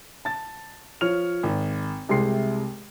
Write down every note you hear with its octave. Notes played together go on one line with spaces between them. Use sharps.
A5 A6
F3 C#5 F6 F7
G#1
C2 C3 G#3 C6 C7